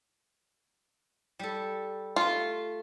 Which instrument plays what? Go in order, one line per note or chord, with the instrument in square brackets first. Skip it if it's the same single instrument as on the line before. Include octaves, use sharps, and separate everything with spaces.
[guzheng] G3 A4
[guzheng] A3 C6 [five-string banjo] F4